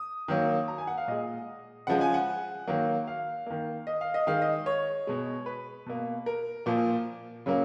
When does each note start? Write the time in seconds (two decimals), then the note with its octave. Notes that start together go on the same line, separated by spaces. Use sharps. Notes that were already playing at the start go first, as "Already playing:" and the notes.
Already playing: D#6
0.28 D#3 F#3 A#3
0.68 A#5
0.78 G#5
0.87 F#5
0.98 F5
1.08 A#2 G#3 D#5
1.87 C#3 F3 G#3 F#5
2.01 G#5
2.14 F#5
2.68 D#3 F#3 A#3
3.07 F5
3.46 D#3 A#3
3.87 D#5
4.01 F5
4.14 D#5
4.27 D#3 G#3 F5
4.42 D#5
4.66 C#5
5.07 B2 G#3
5.46 B4
5.86 B2 A#3
6.26 A#4
6.66 A#2 F3 A#3
7.46 C#3 F#3 A#3